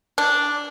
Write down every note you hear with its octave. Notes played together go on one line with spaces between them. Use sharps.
D4